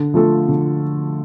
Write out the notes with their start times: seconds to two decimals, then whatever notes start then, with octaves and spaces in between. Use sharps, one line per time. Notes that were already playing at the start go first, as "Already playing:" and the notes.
Already playing: D3
0.14 F3 A3 F4 A4
0.48 D3